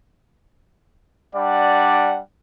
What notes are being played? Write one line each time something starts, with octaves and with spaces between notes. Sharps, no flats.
G3 D4 D5 F#5